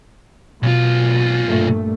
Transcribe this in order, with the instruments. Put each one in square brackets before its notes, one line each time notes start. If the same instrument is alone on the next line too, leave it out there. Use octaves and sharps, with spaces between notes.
[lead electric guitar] B1 F4 [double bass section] B2
[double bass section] G2 A#2 A3